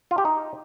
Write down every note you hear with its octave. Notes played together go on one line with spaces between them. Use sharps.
F4
G4
D#4